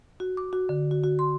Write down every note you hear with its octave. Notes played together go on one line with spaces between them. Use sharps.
F#4
D6
F#4
D3
F#4
F#4
C6